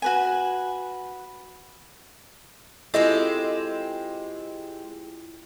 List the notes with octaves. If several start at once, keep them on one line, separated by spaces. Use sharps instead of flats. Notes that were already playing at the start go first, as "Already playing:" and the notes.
F#4 B4 G#5
G#3 C4 E4 F4 G4 A4 D#5